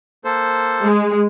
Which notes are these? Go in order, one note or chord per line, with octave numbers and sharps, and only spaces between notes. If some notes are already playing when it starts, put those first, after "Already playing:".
A#3 A4 C5
G#3